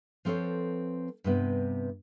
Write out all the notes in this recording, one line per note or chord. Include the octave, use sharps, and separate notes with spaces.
F3 C4 A4 B4 C#5
G2 C3 B3